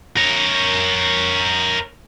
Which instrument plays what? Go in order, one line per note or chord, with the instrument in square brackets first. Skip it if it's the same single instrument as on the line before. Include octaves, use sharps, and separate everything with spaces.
[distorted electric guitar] A#4 C#5